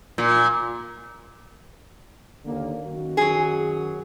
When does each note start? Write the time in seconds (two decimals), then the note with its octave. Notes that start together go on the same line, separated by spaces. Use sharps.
0.18 A#2
2.44 D#2 D3 A#3
2.84 F#2 D#3 F#4
3.17 F#3 G#4